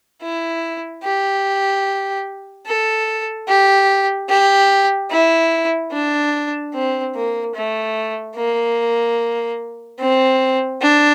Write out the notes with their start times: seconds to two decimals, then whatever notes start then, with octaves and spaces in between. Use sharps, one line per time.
0.22 E4
1.03 G4
2.66 A4
3.48 G4
4.29 G4
5.10 E4
5.92 D4
6.74 C4
7.15 A#3
7.55 A3
8.36 A#3
9.99 C4
10.82 D4